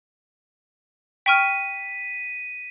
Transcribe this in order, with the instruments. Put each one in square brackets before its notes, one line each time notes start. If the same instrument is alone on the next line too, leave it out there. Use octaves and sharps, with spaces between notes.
[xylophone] G5 C#6 F6 [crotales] B6 D#7